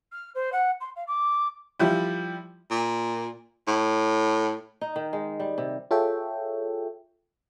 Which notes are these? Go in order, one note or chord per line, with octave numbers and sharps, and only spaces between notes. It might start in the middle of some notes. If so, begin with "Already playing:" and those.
F6
C5
F#5
C6
F5
D6
F3 G3 E4
A#2
A2
D#4
D#3
G#3
G3
C3
F4 G#4 A4 C#5 E5 G5